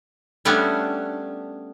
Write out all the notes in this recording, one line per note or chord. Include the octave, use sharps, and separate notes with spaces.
G3 A3 B3 C#4 D4